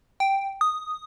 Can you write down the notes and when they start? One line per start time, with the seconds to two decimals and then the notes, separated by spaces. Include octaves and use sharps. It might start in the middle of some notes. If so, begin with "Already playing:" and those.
0.20 G5
0.61 D#6